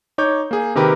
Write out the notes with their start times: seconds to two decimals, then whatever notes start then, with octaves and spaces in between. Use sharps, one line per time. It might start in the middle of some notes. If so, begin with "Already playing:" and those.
0.18 D#4 C#5 D6 G6
0.51 A#3 G#4
0.75 C3 D#3 G4 A#4 B4